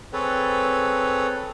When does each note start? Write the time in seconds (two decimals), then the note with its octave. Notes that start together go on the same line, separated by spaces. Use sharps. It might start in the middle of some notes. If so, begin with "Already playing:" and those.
0.13 C4 G#4 A4 B4 C#5